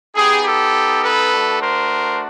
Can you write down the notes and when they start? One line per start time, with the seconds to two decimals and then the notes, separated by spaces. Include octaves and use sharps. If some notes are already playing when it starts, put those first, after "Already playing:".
0.15 B3 D#4 G4 G#4
0.44 G4 A4
1.02 A4 B4
1.31 A3 D4 F#4
1.60 A#4 C5